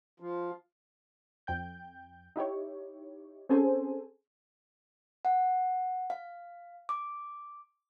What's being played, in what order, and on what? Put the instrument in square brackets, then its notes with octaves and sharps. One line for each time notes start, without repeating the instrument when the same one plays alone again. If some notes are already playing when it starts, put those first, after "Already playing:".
[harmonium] F3
[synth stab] F2 G5 G6
D#4 E4 G4 C#5
C4 C#4 G#4 A4 C5 G#5
[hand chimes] F#5
F5
D6